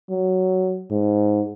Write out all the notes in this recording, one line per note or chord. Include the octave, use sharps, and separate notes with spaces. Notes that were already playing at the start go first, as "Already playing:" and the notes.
F#3
G#2